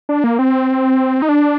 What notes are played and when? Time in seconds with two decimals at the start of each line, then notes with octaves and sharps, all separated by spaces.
0.09 D4
0.24 A#3
0.39 C4
1.22 D#4
1.29 D4